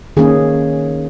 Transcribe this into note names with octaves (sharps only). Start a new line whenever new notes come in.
D#3 A#3 C#4 G#4